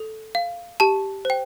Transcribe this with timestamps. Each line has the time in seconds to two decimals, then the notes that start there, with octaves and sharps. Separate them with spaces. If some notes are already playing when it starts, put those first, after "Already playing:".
Already playing: A4
0.35 F5
0.80 G4 A5
1.25 C5 G5